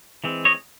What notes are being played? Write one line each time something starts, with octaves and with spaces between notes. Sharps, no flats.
E3 G#3 C4
C#5 D#5